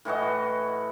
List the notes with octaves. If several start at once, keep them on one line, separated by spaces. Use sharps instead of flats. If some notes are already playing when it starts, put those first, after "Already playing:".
A2 E3 F#4 D#5